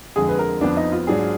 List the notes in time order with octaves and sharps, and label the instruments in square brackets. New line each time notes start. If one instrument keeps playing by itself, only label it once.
[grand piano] F2 D3 G#3 [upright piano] G#4
[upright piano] B4
A#4
[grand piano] F2 F3 B3 [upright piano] D4
[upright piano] D#4
F4
[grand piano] G#2 F#3 D4 G#4